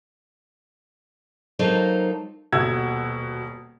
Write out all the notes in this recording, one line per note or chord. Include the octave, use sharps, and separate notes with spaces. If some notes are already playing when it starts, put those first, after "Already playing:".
F#3 A#3 D#4 F4 A4 C5
D#1 B2 F#5 E6 G#6